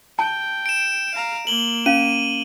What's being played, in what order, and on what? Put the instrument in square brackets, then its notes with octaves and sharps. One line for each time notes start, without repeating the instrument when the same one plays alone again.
[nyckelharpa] G5 [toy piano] A5
[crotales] D7 E7
[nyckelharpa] F5 A#5
[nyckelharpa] A#3 [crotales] F#7 G7
[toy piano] C#4 F5 [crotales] D#7